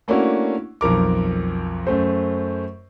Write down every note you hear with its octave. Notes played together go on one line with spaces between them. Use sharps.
A3 A#3 C#4 D4 E4 F#4
B1 F2 A#4 D6
F#2 A3 C5